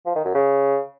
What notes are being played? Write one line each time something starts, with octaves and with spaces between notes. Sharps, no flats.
F3
D#3
F#2
C#3